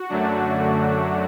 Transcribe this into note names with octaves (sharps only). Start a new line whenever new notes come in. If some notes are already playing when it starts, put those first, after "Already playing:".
Already playing: F#4
F#2 D3 F#3 A3 D4